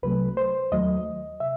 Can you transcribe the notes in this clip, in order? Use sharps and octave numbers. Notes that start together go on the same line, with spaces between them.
C2 C3 F#3 A3 B4
C5
D#2 D#3 F#3 A3 D#5
C3 E5